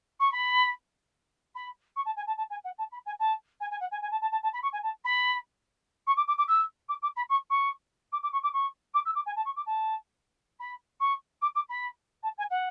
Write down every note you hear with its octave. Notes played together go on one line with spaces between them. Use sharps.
C#6
B5
B5
C#6
A5
G#5
A5
A5
G#5
F#5
A5
B5
G#5
A5
G#5
G#5
F#5
G#5
G#5
A5
A5
A5
A5
B5
C#6
G#5
A5
B5
C#6
D6
D6
D6
E6
D6
D6
B5
C#6
C#6
D6
D6
C#6
D6
C#6
D6
E6
D6
G#5
A5
C#6
D6
A5
B5
C#6
D6
D6
B5
A5
G#5
F#5